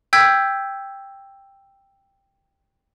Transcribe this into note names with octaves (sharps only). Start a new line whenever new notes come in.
G5 E6 G6 G#6 B6